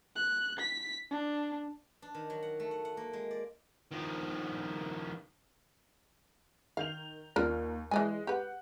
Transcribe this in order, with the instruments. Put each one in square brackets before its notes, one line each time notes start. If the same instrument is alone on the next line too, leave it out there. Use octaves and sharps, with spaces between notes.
[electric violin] F#6
B6
D4
[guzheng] D4
D#3
F#3
F#5
A3
F#5
F#5
A#3
G#3
D5
[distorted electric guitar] D#3 F3
[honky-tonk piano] D#3 G6 F7 [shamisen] F5
[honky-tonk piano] D#2 A#3 [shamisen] F4 A#4 D5
[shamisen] E3 D5 G#5 [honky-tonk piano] G#3 D#5
[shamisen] G4 B4 [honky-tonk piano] F#5